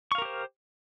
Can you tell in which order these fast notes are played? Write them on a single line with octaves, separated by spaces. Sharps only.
C#6 F5 A#4 G4 C5